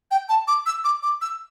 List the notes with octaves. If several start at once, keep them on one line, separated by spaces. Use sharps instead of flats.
G5
A5
D6
E6
D6
D6
E6